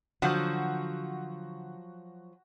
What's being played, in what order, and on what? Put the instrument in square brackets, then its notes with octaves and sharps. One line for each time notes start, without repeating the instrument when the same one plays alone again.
[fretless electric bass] D3 [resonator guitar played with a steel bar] F3 F#3 [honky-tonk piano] F#4 G6